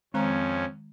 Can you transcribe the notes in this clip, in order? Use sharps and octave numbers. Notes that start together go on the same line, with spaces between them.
F2 D#3 G#3 C4 C#4 A#5